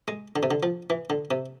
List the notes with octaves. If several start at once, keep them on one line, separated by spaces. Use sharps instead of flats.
G#3
D3
C3
D3
F3
E3
D3
C3